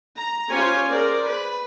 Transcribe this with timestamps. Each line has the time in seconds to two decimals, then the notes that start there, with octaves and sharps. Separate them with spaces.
0.17 A#5
0.50 C#4 F4 G4 C5 C#5 G#5
0.88 G#4 A#4 C5 D5
1.27 B4